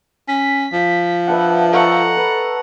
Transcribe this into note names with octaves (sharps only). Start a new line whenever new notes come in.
C#4 B6
F3
D4 B4 E5 F#5
A4 D#5 F#5 A#5 C#6
B4